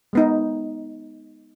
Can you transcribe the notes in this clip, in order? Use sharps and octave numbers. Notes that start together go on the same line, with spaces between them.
G#3 B3 D#4